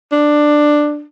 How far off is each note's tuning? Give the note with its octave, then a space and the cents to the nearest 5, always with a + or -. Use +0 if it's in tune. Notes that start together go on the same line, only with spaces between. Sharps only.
D4 +10